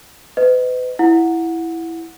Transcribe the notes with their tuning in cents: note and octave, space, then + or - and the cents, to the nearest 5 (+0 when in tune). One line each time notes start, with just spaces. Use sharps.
B4 +35 D#5 +0
E4 +5 F#5 -15